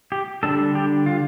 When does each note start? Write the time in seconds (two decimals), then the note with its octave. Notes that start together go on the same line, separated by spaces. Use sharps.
0.12 G4
0.43 D3 G3 D4 A4
0.75 G4
1.06 F4